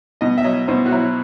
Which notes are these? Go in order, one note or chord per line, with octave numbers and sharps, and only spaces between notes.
B2 D#5
E5
F#3 D#5
B2 C5
F#4
F#3 E4